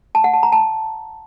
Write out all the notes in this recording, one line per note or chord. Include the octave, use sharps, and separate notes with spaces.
A5
F#5
A5
A#5
A5